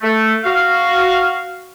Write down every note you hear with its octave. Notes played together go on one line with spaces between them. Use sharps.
A3
F#4 F5